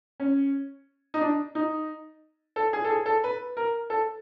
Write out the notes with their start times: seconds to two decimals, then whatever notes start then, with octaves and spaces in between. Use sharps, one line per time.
0.20 C#4
1.14 D#4
1.21 D4
1.55 D#4
2.56 A4
2.73 G#4
2.84 A4
2.90 G#4
3.06 A4
3.24 B4
3.57 A#4
3.90 A4